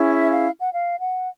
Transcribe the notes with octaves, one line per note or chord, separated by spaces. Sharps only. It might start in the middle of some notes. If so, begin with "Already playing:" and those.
Already playing: C#4 E4 G#4
E5
F5
F#5
F5
F#5